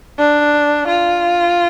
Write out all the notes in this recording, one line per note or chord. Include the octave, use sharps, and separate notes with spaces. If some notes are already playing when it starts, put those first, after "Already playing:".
D4
F4